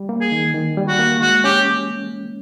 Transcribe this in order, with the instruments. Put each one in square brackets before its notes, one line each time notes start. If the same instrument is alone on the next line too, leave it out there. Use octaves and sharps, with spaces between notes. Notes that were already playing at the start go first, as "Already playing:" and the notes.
Already playing: [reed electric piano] G3
A#3
[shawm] G#4
[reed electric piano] D#3
D#3
G3
[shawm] F#4
[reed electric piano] A#3
[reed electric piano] G#3 [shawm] F#4
[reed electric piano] C#4 [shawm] G4